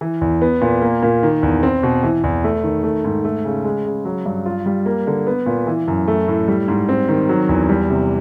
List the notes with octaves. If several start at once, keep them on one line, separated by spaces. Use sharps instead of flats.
E3
E2
B3
A#2
A#3
A#2
D#3
E2
C4
B2
E3
E2
A3
D#3
A3
G#2
A3
C#3
G#3
C#3
F#3
G2
F4
G3
A#3
D3
B3
A#2
E3
F#2
A3
A2
G3
G#2
C4
D#3
F#3
E2
G3
C3